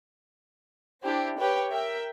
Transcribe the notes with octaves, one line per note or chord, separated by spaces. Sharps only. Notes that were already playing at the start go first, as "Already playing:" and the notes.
D4 E4 G4 C5
G4 B4 C#5 G5
A#4 E5 G5